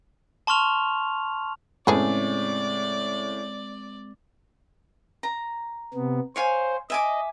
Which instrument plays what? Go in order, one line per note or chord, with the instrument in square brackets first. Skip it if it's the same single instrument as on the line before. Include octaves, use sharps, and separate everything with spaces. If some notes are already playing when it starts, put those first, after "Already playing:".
[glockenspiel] A5 C6 C#6 F6 F7
[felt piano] A2 C#3 [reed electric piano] G#3 C4 [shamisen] B3 G#4 A4 [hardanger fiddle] D5
[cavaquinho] A#5
[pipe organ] C3 B3
[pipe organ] C5 [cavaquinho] C#5 F5 G#5
[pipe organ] D#5 [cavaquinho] E5 G#5 D6